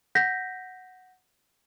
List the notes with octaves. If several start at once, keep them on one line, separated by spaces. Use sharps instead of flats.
F#5 G6 A#6 B6